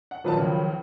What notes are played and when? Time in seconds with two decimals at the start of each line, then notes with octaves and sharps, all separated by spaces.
0.11 F#5
0.24 A#2 D#3 F3 F#3 B4 A5
0.37 C#2 C#3